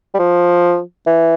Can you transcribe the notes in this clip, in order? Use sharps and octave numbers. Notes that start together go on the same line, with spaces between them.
G3
F3
E3